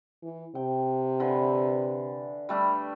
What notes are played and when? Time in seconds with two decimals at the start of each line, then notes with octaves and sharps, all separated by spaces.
0.23 E3
0.55 C3 G5
1.20 D3 E3
2.49 G3 A3 D4